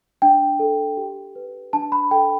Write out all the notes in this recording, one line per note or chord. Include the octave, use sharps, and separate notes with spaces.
D4 G5
A4
G4
B4
D4 A5
B5
A4 G5